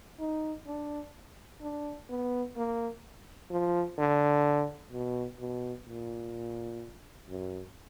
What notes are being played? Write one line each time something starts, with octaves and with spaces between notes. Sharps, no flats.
D#4
D4
D4
B3
A#3
F3
D3
B2
B2
A#2
F#2